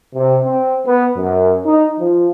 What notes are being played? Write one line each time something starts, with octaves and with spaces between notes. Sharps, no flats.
C3
C4
B3
F#2
D#4
F3